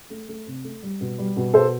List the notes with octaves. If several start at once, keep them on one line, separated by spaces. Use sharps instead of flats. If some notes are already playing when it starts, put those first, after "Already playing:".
A3
A3
C3
A3
G3
B2
G3
B2
B2 A4 C5